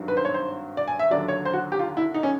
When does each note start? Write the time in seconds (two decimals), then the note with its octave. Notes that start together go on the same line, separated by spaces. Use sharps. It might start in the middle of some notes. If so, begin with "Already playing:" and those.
Already playing: G#1 G2 D#3 F#3
0.08 B4
0.17 C5
0.25 C#5
0.34 C5
0.77 D5
0.88 G#5
0.99 E5
1.11 D#2 D3 F#3 D5
1.28 C#5
1.45 C5
1.53 F#4
1.72 G4
1.79 F4
1.97 E4
2.14 D#4
2.23 C#4